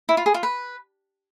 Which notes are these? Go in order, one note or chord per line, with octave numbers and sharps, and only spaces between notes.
E4
F4
G#4
F4
B4